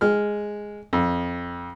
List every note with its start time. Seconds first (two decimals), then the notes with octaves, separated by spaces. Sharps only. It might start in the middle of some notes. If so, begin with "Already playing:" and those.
0.01 G#3 F6
0.93 F2